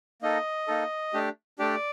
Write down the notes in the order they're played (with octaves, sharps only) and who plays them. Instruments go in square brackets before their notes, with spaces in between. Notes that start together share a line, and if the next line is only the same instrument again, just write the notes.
[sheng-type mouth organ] A#3 D#4 A4 D#5
A#3 D#4 A4
A3 D4 G4
A3 D4 G4 D5